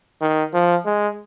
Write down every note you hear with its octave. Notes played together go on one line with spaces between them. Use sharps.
D#3
F3
G#3